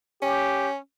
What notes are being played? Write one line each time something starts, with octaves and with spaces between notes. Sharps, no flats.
C#4 G4